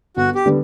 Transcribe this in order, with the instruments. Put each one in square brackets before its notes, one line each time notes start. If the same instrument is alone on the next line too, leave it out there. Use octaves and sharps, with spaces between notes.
[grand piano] G1 [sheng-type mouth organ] F#4
[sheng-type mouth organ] G4
[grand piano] D3 G3 B3